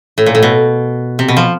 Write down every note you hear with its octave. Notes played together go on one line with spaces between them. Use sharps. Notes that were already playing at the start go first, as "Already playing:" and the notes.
A2
A#2
A2
B2
C3
B2
F3